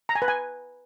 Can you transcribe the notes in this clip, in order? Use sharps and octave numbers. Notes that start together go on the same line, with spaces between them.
A#5
G#5
B4
G#5